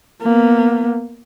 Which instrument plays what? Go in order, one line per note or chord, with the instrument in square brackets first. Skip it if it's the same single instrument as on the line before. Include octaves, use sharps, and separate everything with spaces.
[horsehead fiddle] A#3 B3